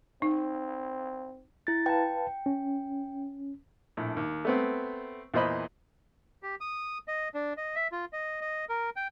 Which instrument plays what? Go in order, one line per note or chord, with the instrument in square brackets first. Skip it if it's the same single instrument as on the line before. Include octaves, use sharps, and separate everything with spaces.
[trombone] C4 [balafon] D#4
[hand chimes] E4 A6
[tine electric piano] B4 F5 A5 [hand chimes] G5
[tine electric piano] C#4
[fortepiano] A#1 A2
D#2
A3 B3 C4
E2 A#2 C5 D#5 B5
[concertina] G4
D#6
D#5
D4
D#5
E5
F4
D#5
D#5
A#4
G5